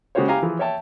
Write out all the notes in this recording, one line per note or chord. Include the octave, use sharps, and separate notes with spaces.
C#3 G#3 F#4 G4 C5 C#5
E4 G4 F5 G#5 A#5
E3 F3 G#4
C#5 E5 G5 A5